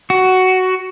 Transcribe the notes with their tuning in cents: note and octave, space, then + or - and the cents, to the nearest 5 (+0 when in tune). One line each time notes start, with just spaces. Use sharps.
F#4 +10